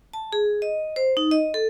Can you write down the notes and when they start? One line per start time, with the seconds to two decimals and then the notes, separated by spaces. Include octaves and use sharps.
0.14 A5
0.33 G#4
0.62 D#5
0.96 C5
1.17 D#4
1.31 D#5
1.54 A4